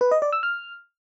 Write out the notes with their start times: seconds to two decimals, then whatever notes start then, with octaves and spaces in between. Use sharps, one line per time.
0.01 B4
0.11 D#5
0.22 D5
0.32 E6
0.43 F6